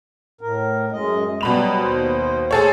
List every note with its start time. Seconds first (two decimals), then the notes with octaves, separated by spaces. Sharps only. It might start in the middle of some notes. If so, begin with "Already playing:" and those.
0.41 A2 A#4
0.92 F#2 G#3 D#5
1.41 B2 F#3 G3 B3 B5 F7
1.80 D#2 C5
2.51 G#4 A4 C#5